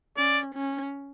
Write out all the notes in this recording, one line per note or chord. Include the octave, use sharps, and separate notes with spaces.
C#4 D5
C#4